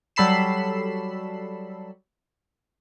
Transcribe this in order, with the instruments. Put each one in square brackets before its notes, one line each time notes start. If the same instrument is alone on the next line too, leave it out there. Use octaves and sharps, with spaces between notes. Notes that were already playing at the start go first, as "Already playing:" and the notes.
[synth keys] F#3 G3 A4 B5 C7 E7